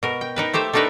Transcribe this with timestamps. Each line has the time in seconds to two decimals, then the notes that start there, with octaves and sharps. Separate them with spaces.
0.03 B2 A#4
0.21 G5
0.36 D#4 A#4 B4
0.53 A3 G4 C5 E5
0.73 A3 D4 D#4 A#4 B4